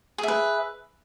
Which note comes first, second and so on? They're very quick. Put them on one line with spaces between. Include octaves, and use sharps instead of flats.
G#4 E5 B4